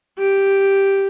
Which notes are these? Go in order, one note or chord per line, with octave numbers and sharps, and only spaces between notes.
G4